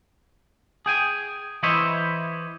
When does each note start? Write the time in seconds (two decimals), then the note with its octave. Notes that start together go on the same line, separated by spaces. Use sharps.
0.86 G#4 G5 G#5
1.63 E3 E4 C5 C#5 D#5 E5